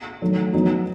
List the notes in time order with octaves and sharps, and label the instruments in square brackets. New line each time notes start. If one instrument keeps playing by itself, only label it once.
[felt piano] D#3 F#3 A3
F#3 B3 D#4 F#4